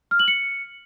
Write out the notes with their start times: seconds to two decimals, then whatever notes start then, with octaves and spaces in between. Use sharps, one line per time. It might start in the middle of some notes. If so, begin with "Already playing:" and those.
0.11 F6
0.19 F#7
0.28 C#7